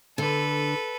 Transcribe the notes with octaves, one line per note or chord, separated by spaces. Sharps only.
D3 A4 B4